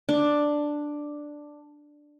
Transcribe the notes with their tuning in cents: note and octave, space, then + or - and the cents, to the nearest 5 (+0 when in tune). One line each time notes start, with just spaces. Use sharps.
D4 +5